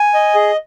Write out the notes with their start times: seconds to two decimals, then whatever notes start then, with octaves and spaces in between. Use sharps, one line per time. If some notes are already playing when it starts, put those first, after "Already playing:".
Already playing: G#5
0.14 D#5
0.35 G#4